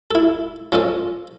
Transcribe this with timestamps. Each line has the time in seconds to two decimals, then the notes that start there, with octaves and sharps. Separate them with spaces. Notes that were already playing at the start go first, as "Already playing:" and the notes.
0.11 E4 A4
0.72 F3 C#4 A4 D#5